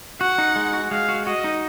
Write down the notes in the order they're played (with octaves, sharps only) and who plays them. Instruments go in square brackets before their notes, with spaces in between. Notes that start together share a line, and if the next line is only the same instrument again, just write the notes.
[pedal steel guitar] F#4 [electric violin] F#5
[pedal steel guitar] D#4
G#3
F#4
[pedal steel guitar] G#3 [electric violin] F5
[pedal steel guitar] F#4
[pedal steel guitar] F#4 [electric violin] D#5
[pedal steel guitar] D#4